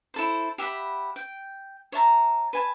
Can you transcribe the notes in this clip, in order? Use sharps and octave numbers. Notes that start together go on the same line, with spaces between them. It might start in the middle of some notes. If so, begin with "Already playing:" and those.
E4 A4 C5
G4 E5 F#5 B5
G5
C#5 E5 A5 A#5
B4 G#5 A5